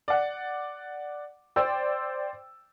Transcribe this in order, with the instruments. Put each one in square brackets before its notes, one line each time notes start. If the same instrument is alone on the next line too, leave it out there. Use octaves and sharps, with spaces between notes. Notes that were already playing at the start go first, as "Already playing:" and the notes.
[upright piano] D5 F#5
[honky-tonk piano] C5 D5 G5 [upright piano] E6